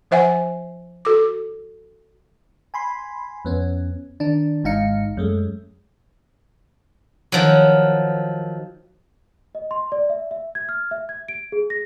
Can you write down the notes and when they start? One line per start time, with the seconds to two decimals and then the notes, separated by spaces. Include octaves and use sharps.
0.11 F3 C5 E5 F#5 G#5
1.05 F#4 A4 D6
2.74 G#5 B5 C6
3.45 F2 B3 C#4
4.20 D#3 D4
4.64 G#1 G#2 D#4 F5 C#7
5.17 F#2 G#3 A3
7.32 D#3 F3 F#3
9.55 D#5
9.71 C6
9.92 D5
10.10 E5
10.31 E5
10.55 G#6
10.69 F6
10.91 E5
11.09 G#6
11.28 D7
11.52 G#4
11.70 A#6